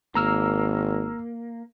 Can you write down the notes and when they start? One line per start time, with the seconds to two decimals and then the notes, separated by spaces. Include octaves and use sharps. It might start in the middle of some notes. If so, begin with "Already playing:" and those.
0.15 G#1 A#3 A#5 E6 F6